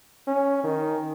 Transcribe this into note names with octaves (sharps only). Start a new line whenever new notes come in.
C#4
D#3